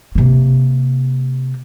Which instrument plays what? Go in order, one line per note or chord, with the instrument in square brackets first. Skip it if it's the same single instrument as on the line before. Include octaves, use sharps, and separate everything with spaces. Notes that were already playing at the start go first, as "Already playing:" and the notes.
[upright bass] C3 A#3